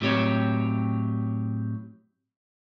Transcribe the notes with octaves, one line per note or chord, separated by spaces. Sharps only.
A2 F#3 C4 G4 C#5